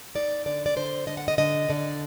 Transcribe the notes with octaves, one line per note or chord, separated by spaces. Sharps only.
D#4 D5
D3 D5
D5
D3 C5
D3 D#5
F#5
D#5
D3 D#5
D3 D5